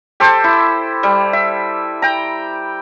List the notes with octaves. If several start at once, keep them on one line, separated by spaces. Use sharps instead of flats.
G4 A4 C5
E4
G3
E5
G5 A#5